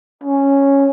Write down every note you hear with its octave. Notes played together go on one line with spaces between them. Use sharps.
C#4